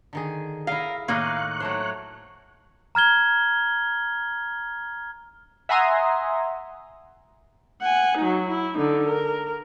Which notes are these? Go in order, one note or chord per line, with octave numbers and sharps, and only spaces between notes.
D3 D#3 G#4
E4 A#4 D#5 F5
A2 D#3 A#3 D#4 D#5 F5 C#6 F#6
F#3 A3 C5 C#5
A#5 F6 G#6 G7
E5 F#5 G#5 A#5 C6 D#6
F#5 G#5
F#3 D#4
E4
D3 D#4
A#4